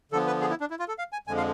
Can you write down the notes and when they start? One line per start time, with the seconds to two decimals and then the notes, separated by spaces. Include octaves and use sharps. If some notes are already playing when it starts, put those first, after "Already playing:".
0.12 D3 F3 B3 A4
0.27 B4
0.41 G#4
0.50 E4
0.60 D4
0.70 E4
0.79 F4
0.88 A4
0.98 F5
1.12 G#5
1.27 F2 D3 F3 G#3 G#5
1.37 F5